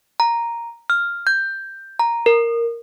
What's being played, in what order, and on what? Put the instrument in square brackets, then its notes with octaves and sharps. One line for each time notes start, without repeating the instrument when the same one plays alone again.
[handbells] A#5
F6
G6
A#5
A#4